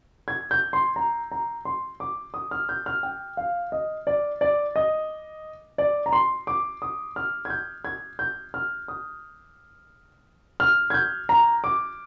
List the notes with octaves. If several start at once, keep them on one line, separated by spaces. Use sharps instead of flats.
G#6
G6
C6
A#5
A#5
C6
D6
D#6
F6
G6
F6
G5
F5
D#5
D5
D5
D#5
D5
A#5
C6
D6
D#6
F6
G#6
G6
G#6
G6
F6
D#6
F6
G#6
G6
A#5
D6